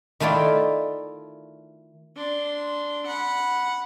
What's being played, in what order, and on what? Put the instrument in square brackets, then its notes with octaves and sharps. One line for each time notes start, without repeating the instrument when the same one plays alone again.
[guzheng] D#3 A3 E4 F4 D5
[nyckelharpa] D4 C6
F#5 B5